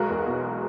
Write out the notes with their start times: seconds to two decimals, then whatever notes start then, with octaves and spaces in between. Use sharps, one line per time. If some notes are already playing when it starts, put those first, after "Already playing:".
Already playing: B1 G#3 F#4 A#4
0.09 E2
0.26 B2